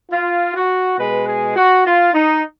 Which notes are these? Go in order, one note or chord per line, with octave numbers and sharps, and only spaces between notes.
F4
F#4
B2 G#3 B4
G#4
F#4
F4
D#4